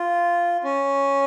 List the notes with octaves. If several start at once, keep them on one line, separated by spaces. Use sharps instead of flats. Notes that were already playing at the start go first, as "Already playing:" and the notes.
Already playing: F4
C#4